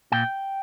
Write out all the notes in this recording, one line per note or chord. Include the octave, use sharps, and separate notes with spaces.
A#2 G5